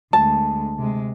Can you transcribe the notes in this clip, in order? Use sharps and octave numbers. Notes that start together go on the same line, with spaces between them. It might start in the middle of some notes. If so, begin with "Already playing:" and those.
D2 G#3 A5
C3 G#3